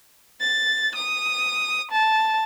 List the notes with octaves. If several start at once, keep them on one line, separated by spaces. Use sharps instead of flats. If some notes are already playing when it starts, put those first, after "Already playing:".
A6
D#6
A5